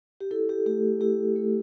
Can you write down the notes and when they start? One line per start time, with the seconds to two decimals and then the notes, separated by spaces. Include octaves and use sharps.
0.20 G4
0.31 E4 A4
0.49 G4
0.66 A3 G4
1.01 E4 G4
1.36 A3